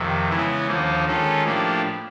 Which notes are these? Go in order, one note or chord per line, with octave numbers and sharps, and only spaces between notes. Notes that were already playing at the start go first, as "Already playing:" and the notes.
Already playing: F2 C3 D#3
C#3 E3 G#3 B3 E4
D#2 D3 F3 A#3 D#4
D#3 G#3 C#4 F4 A4
A2 F3 A#3 D4 G4